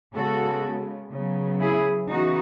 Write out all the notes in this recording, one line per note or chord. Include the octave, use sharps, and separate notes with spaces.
C#3 G#3 B3 F#4 A4
C#3 F#3 B3
E4 G#4
C#3 E3 B3 D#4 F#4